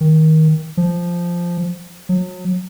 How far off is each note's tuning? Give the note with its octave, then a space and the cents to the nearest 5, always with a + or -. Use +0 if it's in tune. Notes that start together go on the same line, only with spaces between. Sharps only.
D#3 +20
F3 -5
F#3 -35